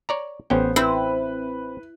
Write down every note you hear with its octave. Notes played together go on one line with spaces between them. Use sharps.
C#5 D5 A#5
A1 B3 C#4 C5 G5
C4 E4 B4